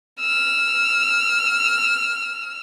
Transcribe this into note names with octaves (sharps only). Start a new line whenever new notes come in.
E6 F6